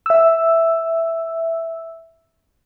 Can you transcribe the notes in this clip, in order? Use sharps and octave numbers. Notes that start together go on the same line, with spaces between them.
E5 E6